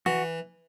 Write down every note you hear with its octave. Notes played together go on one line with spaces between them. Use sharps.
E3 F#4